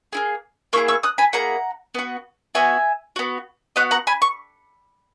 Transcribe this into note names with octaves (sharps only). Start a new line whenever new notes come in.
A#3 E4 G#4
A#3 E4 G#4 C#6 E6
C#6 E6
D#6 F#6
G#5 B5
A#3 E4 G#4 F#5 A#5
B3 F#4
B3 F#4 E5 G#5
B3 F#4
B3 F#4 D#5 F#5
F#5 A#5
G#5 B5
C#6